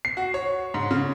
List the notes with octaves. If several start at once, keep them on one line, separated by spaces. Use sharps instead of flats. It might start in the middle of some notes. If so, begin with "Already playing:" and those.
C7
F#4
C#5
G#2
C#3